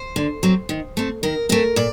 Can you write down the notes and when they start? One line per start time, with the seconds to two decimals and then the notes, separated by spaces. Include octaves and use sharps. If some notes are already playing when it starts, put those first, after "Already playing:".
Already playing: C5
0.16 D3
0.43 F#3 C4
0.69 D#3
0.97 A3 C4
1.23 D#3 A#4
1.49 A3 C4 A#4
1.76 A#2 D5